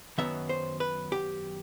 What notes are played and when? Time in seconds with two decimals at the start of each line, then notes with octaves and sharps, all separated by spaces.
0.18 F#2 D#3 F#3 B3 E5
0.49 C5
0.80 B4
1.12 G4